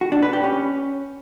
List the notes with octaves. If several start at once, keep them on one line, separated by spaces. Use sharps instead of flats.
F#4
D4
B4
G4
C#4